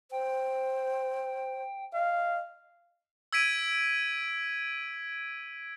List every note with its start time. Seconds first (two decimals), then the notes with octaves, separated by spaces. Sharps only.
0.11 C5 G5
1.94 D#5 F5
3.33 E6 G#6 B6 D7 D#7